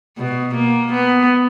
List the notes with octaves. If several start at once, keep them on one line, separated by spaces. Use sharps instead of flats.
B2
A#3
B3